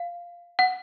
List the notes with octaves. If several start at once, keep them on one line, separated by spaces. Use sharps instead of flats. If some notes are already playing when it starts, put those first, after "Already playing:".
Already playing: F5
F#5